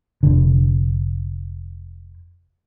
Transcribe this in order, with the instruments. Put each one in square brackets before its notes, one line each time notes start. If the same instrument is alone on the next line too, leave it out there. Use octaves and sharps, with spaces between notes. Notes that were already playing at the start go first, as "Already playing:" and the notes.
[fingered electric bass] F1 D3